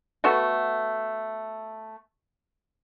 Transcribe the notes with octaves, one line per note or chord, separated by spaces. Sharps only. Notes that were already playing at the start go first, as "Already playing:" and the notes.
A3 B3 F#4 A4